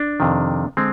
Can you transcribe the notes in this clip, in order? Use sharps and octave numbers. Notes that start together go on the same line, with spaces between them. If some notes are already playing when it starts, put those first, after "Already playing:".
Already playing: D4
F2 C3 D#3
D3 G#3 C4